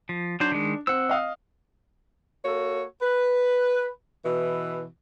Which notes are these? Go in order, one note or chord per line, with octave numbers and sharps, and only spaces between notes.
F3
F#3 D4 C5
D#3 G#3
C4 F#5 E6
D#5 F5 D#6
A#3 F#4 A4 C#5
B4
B2 E3